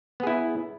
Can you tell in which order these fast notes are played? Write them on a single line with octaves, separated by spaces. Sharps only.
B3 G#4 E4